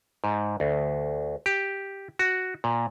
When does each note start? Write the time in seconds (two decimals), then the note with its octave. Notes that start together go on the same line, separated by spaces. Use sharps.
0.24 G#2
0.60 D2
1.46 G4
2.19 F#4
2.64 A#2